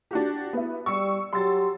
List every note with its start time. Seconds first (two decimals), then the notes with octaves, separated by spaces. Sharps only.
0.11 D4 F#4 G4
0.53 B3 E4
0.86 G3 C#6 E6 C#7
1.33 F#3 G4 C6 E6 A6